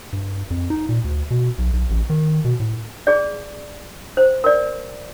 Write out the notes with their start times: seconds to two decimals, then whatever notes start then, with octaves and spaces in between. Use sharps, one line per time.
0.13 G2
0.51 F2
0.70 D#4
0.89 A#2
1.04 D2
1.31 B2
1.58 B1
1.73 B1
1.90 A1
2.10 D#3
2.45 B2
2.60 A2
3.07 G#4 D5
4.17 C5
4.44 A#4 D5